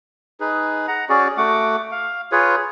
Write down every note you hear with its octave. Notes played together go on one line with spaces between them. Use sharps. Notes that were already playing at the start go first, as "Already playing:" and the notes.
D#4 G#4 B4
F#5 A#5
C#4 F#4 G#4 D5
A3 F#4 F#5 D6
F5
F4 G#4 B4 C#5